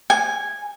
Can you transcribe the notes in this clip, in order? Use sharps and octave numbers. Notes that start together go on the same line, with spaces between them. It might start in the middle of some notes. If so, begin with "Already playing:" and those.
G#5